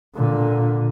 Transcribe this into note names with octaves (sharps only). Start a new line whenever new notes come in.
A#2 D3